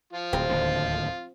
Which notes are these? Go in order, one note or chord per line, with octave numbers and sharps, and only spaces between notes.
F3 F4
D1 C4
D1 D#2 D3